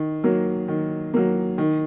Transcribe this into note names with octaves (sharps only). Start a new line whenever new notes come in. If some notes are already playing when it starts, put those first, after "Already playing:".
Already playing: D#3
F#3 A#3
D#3
F#3 A#3
D#3